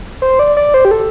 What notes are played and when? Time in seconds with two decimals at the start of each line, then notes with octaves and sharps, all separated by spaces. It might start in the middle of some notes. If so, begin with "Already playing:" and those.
0.22 C5
0.39 D5
0.57 D5
0.74 C5
0.85 G4
0.91 A4